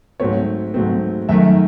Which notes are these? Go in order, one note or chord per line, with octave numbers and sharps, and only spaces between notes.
G#2 F#3 A3 C4 C#5
G#2 F#3 A3 C4
F#2 D#3 A3 E5